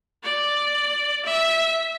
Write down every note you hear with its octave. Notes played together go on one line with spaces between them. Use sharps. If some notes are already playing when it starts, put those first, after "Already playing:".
D5
E5